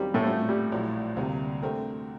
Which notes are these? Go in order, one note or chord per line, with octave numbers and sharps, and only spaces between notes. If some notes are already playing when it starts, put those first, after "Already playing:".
Already playing: D#2 D#3 F#3 G3 C4
A2 A3
A#2 G3 C4 F#4
G3
A#1 A2 F#3
D2 C3 G3 A#3
D3 A3 C4 G4 A#4